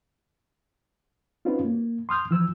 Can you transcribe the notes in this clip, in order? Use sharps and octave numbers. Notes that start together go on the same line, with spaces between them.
C4 C#4 D#4 F4 F#4 B4
A#3
C6 D#6 F6 G6
E3 F3 E6